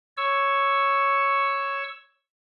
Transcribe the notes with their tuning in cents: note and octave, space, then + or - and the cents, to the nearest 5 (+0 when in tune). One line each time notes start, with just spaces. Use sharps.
C#5 +0 C#6 +0 E6 +0